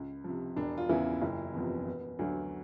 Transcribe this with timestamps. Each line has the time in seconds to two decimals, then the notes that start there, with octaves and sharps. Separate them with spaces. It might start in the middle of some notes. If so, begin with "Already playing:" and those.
Already playing: C#2
0.24 C3 F3
0.56 E1 D4
0.78 F4
0.89 E2 C#3 E3 E4
1.22 F#1 E4
1.54 E2 C3 F3 B3
1.86 E1 B3
2.19 D2 D3 F#3